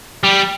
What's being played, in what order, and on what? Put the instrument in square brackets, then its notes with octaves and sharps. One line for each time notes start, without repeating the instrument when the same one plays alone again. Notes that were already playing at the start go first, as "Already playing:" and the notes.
[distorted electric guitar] G3